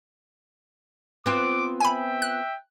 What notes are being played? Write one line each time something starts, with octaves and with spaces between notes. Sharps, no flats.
B3 C4 F4 D6
E5 G5 G#5 B5
F#6